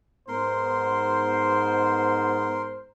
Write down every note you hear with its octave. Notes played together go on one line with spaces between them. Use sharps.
G#2 B3 A#4 C5 C6